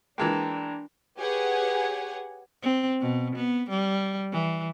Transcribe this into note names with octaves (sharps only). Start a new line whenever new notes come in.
E3 G#3 A#3 D4 G5 A5 A#5
G4 G#4 B4 C#5 F#5 G#5
C4
B2
B3
G3
E3